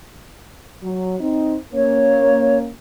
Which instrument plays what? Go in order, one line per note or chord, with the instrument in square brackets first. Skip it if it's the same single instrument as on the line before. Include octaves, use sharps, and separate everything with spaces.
[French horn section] F#3
C4 D#4
[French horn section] A#3 C#4 [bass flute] C#5